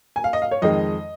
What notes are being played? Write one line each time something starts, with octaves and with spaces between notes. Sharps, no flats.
G#5
F5
D#5
F5
C#5
F2 D#3 G#3 D#5